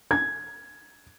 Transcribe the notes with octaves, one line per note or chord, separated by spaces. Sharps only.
G#6